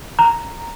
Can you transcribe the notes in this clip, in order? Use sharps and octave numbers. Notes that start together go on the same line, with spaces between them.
A#5